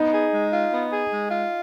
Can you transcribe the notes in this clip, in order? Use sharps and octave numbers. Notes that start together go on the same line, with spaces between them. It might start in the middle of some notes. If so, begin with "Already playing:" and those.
Already playing: B3 D#4
G#4
G#3
F4
B3
G#4
G#3
F4